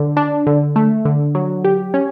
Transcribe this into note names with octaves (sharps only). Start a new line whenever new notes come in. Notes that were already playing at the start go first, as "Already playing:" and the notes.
Already playing: D3
D4
D3
A3
D3
F#3
G4
C#4